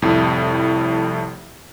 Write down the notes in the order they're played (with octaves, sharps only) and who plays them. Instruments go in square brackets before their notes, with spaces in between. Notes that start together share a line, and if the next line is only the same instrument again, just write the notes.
[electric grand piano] C2 F2 A2